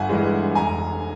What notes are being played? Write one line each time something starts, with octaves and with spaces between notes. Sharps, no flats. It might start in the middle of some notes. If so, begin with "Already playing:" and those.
Already playing: G1 E5 F#5 G#5
G2 E3 G#3
F1 G#5 A#5